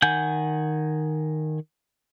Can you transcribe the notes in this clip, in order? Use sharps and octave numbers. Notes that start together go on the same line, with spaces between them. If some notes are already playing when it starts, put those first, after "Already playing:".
D#3 F#5 G#5 G6